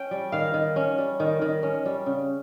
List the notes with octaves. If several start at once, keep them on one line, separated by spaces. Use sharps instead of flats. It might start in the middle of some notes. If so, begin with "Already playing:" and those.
Already playing: C#4 G5
G3
D#3 F5
D#3
C#4
G3
D#3
D#3
C#4
G3
C#3